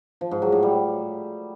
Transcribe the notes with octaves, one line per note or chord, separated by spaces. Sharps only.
F3
G#2
F#3
A2
G3